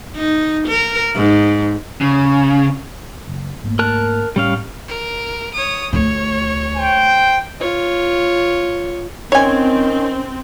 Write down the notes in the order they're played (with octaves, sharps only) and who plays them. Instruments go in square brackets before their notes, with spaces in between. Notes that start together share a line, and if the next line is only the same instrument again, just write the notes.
[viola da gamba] D#4
A#4
G#2
[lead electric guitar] C#3
[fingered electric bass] F#1
G#2 A3 A#3
[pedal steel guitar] A#4 A5 F#6
[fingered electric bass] A2 [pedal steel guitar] G3 C#4 F5
[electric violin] A#4
C#5 D#6
[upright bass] D2 [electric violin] C#5
[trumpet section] C5 G5
[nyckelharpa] F4 C#5
[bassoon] D#3 [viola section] C4 [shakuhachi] C#4 [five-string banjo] C#5 G#5